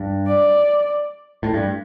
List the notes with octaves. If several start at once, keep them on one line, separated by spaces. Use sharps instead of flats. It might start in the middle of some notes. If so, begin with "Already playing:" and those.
Already playing: G2
D5
A2
G2